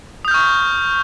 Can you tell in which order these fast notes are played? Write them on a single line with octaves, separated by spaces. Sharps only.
D#6 G6 F6 C#6